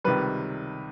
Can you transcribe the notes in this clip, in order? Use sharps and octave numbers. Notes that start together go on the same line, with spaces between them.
C#2 C3 D#3 G3 B4